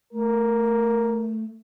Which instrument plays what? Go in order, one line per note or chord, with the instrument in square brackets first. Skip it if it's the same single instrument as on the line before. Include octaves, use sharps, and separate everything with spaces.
[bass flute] A3 [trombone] A#4